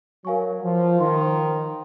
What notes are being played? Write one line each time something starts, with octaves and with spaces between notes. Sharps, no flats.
F#3 A#4 F5 G#5 C#6
F3
D#3 C5 F5 C6